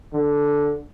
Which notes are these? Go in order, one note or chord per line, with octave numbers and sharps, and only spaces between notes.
D3